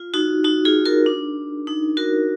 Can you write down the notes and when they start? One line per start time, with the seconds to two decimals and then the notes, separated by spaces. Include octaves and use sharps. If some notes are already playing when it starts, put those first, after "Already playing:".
Already playing: F4
0.14 D#4 F#4
0.44 D#4 F#4
0.65 F4 G#4
0.85 F#4 A#4
1.06 D4
1.67 D#4
1.97 F#4 A#4